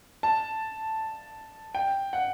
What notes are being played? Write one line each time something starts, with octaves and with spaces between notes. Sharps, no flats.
A5
G5
F#5